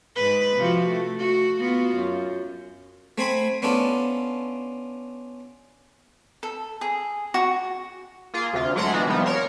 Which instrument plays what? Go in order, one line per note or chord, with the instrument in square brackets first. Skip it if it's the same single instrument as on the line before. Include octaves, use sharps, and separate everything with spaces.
[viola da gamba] G#2 B4
C3 F3 F#4
A3
F#4
B3 F4 F#4
F#2
[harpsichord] A3 C4 G#5 B5
B3 C#4 D4 F4 A4
[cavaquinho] A4
G#4
F#4
[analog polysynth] A#3 F4 G#4
D2 C3 F4
F#3 G#3 A3 F#5 A#5 C6
E3 B3 D4 F4 F#4
C3 D#3 F3 G3 B3
A#4 C#5 C6